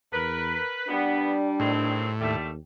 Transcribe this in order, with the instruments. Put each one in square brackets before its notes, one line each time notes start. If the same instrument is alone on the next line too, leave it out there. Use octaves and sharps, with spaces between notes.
[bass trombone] E2 [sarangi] A#4 [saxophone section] B4
[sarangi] G3 [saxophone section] B3 [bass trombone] D4
[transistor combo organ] A2 [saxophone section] D#3 G#3 C4
[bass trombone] D#2 [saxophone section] D3 G3 A3